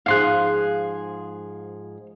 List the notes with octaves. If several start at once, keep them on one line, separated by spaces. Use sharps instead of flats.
G#2 F3 G#4 F5 C6 F#6